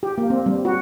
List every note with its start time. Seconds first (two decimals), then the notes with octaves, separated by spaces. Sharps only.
0.03 G4
0.18 A#3
0.30 C4
0.46 G3
0.65 F#4